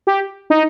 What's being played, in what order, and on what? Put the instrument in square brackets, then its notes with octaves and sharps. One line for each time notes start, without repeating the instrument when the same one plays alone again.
[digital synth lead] G4
D#4